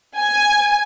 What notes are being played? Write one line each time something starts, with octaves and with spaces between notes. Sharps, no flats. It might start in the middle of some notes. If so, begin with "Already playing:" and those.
G#5